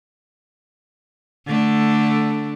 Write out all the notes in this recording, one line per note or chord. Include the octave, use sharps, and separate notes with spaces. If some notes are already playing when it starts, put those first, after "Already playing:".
D3 A3 D4